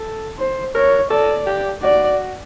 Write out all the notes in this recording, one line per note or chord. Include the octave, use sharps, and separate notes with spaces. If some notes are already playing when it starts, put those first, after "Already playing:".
Already playing: A4
C5
A#4 C#5
A4 D5
G4
F#4 D5